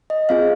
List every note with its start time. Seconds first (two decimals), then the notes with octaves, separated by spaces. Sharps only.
0.10 D#5
0.29 C4 F4 G#4 F5